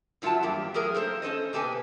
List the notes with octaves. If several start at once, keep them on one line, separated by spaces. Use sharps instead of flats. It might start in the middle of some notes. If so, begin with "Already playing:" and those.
F#2 F#3 F4 E5 F#5 A5
E2 G2 A#3 G4
F#3 A3 G#4 A#4
A#3 A4 C5
C#4 A4 C5 D#5
B2 A#3 G4 A4 B4 G#5